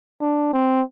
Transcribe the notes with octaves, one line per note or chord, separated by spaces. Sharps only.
D4
C4